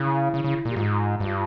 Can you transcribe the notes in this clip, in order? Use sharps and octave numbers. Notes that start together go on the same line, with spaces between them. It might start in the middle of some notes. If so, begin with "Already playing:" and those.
Already playing: C#3 E4
C#3
C#3
A#2
G4
G#2 F4
G2